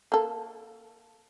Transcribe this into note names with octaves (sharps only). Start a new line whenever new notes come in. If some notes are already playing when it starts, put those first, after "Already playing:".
A#3 A4